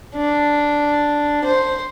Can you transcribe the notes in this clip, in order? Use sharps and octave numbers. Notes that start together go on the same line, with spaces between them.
D4
C5